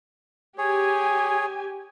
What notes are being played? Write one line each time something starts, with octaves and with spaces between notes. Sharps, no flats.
G4 G#4 C#5 G#5